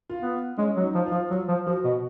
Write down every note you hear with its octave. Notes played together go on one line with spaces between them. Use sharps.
F4
B3
G#3 C#4
F#3
D#4
F3
F4
F3
F#3 F4
F3
F3 F#4
B2